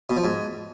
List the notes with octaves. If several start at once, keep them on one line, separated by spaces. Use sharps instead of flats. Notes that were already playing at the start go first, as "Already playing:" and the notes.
B2
F3
G#2